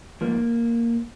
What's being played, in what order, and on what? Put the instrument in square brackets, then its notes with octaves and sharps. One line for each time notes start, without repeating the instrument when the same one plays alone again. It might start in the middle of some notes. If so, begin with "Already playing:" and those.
[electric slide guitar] G#2 F3 A#3